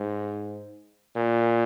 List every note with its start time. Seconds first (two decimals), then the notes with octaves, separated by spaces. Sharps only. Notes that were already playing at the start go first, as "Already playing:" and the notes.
Already playing: G#2
1.16 A#2